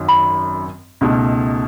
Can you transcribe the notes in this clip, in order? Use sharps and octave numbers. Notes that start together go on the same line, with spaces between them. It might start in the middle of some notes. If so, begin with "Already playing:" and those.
Already playing: G#1 F#2 D#3 F#3
B5
C#2 B2 A3 D#4